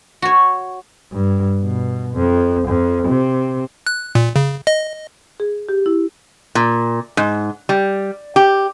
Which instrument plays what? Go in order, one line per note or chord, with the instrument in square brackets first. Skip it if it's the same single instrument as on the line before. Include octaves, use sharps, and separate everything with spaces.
[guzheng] F#4 C#5
[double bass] G2
B2
F2
F2
C3
[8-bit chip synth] F#6
A#2
C#3
D#5
[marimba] G#4
G4
E4
[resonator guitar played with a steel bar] A#2
G#2
G3
G4